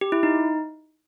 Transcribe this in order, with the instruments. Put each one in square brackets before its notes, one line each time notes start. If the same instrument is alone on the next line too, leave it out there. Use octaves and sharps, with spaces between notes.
[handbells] G4
E4
D#4